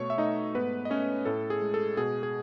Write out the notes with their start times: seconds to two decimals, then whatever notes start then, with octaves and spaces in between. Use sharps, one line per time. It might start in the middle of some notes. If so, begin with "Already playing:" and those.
Already playing: B2 A3 C#5 C#6
0.10 E5
0.18 A3 D#4 D#5
0.55 G#2 B3 B4
0.85 D#5
0.90 A3 C#4 C#5
1.25 A2 A4
1.50 G#4
1.62 G#3
1.74 A4
1.97 B2 G#4
2.23 G#4